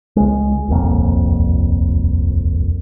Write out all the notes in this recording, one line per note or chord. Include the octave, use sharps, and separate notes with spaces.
C#2 G#3
D#1 C2 F2 A#3